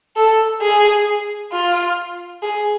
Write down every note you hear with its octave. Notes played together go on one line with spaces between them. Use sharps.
A4
G#4
F4
G#4